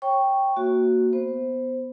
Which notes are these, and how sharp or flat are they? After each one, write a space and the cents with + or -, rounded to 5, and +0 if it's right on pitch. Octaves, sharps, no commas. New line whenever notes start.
C#5 -25 G5 +0 C#6 +0
A#3 +0 F#4 +0 E5 +30
B3 +5 C5 +0